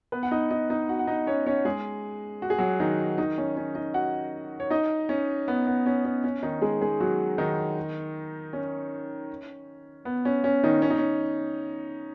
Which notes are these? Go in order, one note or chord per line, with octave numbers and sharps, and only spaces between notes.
B3 B4
F#5
D#4 D#5
D#4 D#5
D#4 D#5
F#4 F#5
F#5
D#4 D#5
C#4 C#5
C#4 C#5
G#3 G#4
F#4
G#4
F#3 F#4
D#3 D#4
D#3 D#4
C#4
C#4
D#4 D#5
F#4 F#5
C#5
D#4 D#5
C#4
B3
B3
C#4
C#4
C#4
D#3 D#4
G#3 G#4
G#3 G#4
F#3 F#4
D#3 D#4
C#4
B3
C#4
C#4
D#3 D#4
C#4
D#4
C#4